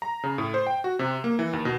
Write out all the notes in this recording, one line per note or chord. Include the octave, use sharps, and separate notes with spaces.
A#5
C#3
A2
C5
G5
F#4
C3
A#3
E3
D#2
B2